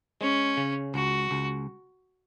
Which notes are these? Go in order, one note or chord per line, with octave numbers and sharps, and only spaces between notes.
G#3 C#4
C#3
C#2 F#4
C#2